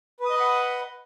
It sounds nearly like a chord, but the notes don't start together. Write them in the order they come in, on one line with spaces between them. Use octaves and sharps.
B4 D#6 D#5 B5 F#5